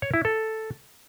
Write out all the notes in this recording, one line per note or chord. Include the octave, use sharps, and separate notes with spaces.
C#5
E4
A4